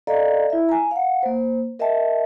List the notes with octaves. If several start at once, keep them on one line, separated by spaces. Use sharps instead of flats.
A4 D5 D#5 F5 A#5
E4 E5
G#5 A#5
F5 F#5
A#3 C5
A#4 D#5 E5 G5 A5